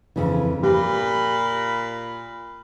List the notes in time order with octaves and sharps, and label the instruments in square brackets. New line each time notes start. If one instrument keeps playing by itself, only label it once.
[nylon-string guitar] F2 C#3 E3
[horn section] A#2 B5 [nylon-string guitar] G4